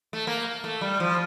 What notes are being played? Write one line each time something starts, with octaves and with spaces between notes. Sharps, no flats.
A3
A#3
A3
G3
F3